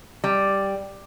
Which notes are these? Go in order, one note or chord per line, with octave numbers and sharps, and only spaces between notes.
G3